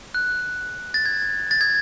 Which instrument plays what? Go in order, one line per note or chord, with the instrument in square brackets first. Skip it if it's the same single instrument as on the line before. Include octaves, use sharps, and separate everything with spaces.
[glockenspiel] F#6
A6
G#6
A6
G#6